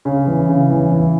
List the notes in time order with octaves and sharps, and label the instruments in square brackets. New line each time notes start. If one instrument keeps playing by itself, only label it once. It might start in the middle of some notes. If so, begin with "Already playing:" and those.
[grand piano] C#3
E3
C#3
E3
E3